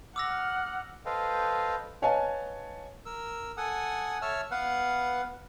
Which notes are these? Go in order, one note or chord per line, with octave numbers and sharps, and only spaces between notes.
F#5 D6 E6 F6 A#6
A4 B4 C5 D#5 F5 G5
B4 C#5 D#5 F5 G#5 A5
A#4 E6
A4 F#5 G#5 D#6
C#5 E5 A5 E6 F6
B3 B4 F5 F#5